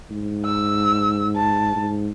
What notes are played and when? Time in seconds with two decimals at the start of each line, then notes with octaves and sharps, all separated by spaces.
0.11 G#2
0.45 E6
1.36 A5
1.76 G#2